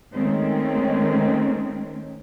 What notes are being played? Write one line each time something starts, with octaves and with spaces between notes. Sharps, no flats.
D#3 G#3 A3 C4 C#4